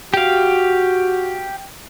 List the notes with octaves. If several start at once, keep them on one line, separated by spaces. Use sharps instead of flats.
F#4 G4 F5